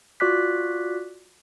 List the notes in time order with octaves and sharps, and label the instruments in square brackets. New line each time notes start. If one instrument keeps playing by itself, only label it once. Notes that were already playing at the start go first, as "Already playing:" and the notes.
[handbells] F4 F#4 D5 D6 F#6 B6